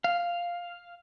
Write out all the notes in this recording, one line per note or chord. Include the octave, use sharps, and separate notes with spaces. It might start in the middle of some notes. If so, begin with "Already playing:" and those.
F5